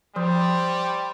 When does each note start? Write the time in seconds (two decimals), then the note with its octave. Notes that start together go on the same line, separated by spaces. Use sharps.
0.16 F3 G3 C5